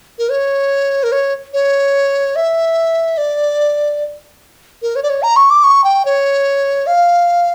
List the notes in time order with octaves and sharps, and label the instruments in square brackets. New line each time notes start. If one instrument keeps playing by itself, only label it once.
[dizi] A#4
C#5
A#4
C#5
C#5
E5
D5
A#4
C#5
D5
C#5
A#5
C#6
D6
C#6
G5
C#5
F5